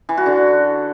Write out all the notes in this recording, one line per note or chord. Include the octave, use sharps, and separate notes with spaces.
E3
F#4
D3